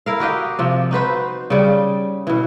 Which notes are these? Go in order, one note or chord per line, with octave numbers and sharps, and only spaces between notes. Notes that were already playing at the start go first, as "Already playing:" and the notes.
E4 A#4 F5
F#4 G4 D#5 F5
C3 F3
D#4 F#4 B4 C5
C#3 G3
B2 E3